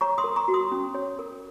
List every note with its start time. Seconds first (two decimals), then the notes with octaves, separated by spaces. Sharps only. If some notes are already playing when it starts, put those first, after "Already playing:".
0.01 C#5 A#5 C#6
0.18 C6 D#6
0.24 A#4
0.36 A#5 C#6
0.48 F#4
0.54 C6 D#6
0.72 C#4
0.95 C#5
1.19 A#4